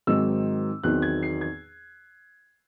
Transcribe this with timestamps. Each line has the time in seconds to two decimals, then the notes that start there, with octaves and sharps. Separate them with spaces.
0.07 G#2 D#3 F#3 C4 D#4 E6
0.83 E2 D#3 F#3 C4 D#4 F#6
1.02 G#6
1.23 C7
1.41 G#6